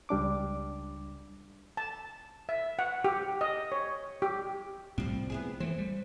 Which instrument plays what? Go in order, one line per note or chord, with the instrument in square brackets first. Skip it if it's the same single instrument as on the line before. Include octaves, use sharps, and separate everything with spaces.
[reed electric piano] C#2 G3 D4 D6
[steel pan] A5
E5
F#5
G4
D#5
C#5
G4
[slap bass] C2 A2 C4 [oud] F3 G3
[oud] B3 E4 G#4
[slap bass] E3 A3 [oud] C5
[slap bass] G3